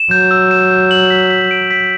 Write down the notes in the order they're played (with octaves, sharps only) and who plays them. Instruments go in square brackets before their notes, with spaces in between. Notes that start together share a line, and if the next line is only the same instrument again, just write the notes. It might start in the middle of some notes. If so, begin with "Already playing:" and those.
Already playing: [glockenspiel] E7
[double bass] F#3 [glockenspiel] G6
[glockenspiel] E6
E7
G6
F#7
B6
B6
D7
B6